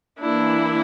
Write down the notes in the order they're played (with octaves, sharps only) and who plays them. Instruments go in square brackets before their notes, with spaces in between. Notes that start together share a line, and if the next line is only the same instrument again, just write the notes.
[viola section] E3 A#3 D4 E4